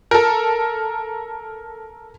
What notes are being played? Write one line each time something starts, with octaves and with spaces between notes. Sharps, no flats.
A4 A#4